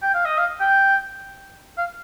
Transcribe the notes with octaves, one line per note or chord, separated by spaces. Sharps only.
G5
F5
D#5
F5
G5
F5